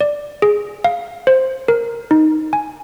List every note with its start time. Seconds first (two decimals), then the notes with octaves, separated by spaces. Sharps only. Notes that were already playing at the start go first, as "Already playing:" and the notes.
0.01 D5
0.42 G#4
0.84 F5
1.27 C5
1.68 A#4
2.11 D#4
2.53 G#5